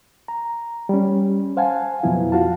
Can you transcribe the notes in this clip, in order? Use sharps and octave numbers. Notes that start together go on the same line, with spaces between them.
A#5
G3 C#4
C5 F5 F#5 G#5 A5
F2 B2 F3 F#3 B3 E4
F4 F#4 F5 A5